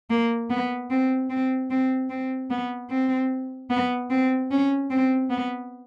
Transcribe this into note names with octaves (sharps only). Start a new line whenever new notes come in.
A#3
B3
C4
C4
C4
C4
B3
C4
B3
C4
C#4
C4
B3